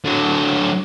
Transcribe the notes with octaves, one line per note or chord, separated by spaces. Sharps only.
D3 F#3